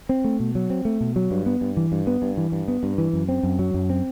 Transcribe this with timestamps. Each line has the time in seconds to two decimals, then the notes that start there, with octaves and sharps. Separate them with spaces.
0.09 C4
0.24 A3
0.40 B2
0.55 F#3
0.70 C4
0.85 A3
1.01 B2
1.16 F#3
1.31 G2
1.46 B3
1.61 G2
1.77 E3
1.92 G2
2.07 B3
2.22 G2
2.37 E3
2.52 G2
2.68 B3
2.83 G2
2.98 E3
3.13 F#2
3.29 C4
3.43 F#2
3.59 F#3
3.74 F#2
3.90 C4